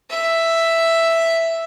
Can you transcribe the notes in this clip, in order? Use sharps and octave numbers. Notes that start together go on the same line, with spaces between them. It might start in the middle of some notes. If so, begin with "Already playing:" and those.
E5